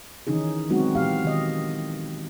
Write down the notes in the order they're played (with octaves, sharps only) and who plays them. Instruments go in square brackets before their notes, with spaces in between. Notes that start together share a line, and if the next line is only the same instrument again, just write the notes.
[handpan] D#3 E3 C#4 D#4 G#4
F#3 G#3 B3 C4 D#4 F#4
A#2 E3 B3 G4 F5
D#3 D#5